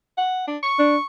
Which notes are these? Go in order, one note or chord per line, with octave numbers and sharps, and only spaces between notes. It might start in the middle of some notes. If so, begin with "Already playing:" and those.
F#5
D4
C#6
D4